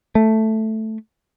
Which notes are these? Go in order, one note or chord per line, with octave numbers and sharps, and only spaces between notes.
A3